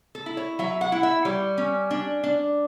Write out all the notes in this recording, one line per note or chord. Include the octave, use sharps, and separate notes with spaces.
A4
E4
C#5
F#3 E5
F#5
E4
E5
G3 C#5
C#4
D4
D4